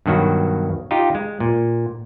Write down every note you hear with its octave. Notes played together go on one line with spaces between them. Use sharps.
G2 B2 D#3 F#3 F#4
D#4 F4 G4
G#3
A#2